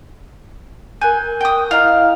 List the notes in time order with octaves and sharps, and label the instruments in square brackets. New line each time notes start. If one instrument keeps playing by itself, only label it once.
[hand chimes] A#4 F#6 G6 [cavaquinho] G#5
[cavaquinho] G5 D#6
[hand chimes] E4 D#5 A#5 [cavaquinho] F5